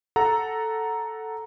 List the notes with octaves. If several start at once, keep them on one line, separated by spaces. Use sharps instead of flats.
A4 F#5 A#5